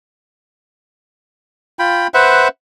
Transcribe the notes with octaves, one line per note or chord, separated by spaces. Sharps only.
F4 G5 B5
B4 C5 E5 F#5